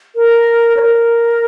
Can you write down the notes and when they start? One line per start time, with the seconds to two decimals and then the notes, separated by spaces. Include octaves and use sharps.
0.16 A#4
0.77 C#5
0.82 A#4